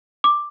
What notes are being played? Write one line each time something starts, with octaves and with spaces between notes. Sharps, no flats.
D6